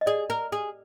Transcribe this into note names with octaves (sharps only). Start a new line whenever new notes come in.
D#5
G#4 D5
A#4
G#4